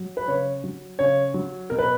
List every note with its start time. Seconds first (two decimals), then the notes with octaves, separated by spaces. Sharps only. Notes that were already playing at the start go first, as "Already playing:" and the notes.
Already playing: F#3
0.17 B4
0.28 C#3 C#5
0.64 F#3
0.99 C#3 C#5
1.34 F#3
1.70 B2 A#4
1.79 B4